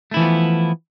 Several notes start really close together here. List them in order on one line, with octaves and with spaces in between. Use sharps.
A3 E4 E3 F3 B3